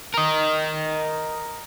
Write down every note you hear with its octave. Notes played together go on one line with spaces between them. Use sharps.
A#4 D#5